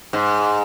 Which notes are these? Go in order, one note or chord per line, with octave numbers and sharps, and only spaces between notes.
G#2